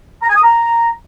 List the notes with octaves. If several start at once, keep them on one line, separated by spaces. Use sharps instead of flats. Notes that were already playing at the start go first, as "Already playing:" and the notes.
A#5
G#5
D#6
A#5